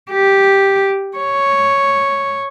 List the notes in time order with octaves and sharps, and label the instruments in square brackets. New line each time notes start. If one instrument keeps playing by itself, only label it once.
[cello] G4
C#5